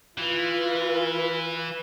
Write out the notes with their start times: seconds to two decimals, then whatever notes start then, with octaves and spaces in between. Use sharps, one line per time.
0.18 E3 F4 B4